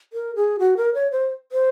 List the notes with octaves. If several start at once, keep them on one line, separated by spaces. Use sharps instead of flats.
A#4
G#4
F#4
A#4
C#5
C5
C5